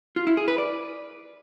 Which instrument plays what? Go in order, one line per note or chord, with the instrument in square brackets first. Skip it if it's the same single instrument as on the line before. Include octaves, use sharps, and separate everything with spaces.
[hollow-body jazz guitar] F4
E4
G#4
B4
D5